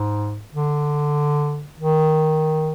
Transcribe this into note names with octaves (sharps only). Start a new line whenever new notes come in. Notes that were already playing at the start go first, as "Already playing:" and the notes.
Already playing: G#2
D3
D#3